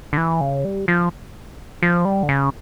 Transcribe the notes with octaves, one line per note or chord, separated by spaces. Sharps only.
D3
E3
C#3
G3
F3
F3
G3
D3
C#3